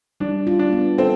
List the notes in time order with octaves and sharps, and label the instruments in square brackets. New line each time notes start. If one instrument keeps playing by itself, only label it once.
[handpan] G3 [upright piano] D4
[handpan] F4
[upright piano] D4
[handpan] B3
[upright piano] C4 [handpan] A4